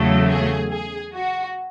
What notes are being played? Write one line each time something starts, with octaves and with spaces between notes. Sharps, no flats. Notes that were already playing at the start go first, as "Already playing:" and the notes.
Already playing: E2 C#3 F#3 A3
G#4
G#4
F#4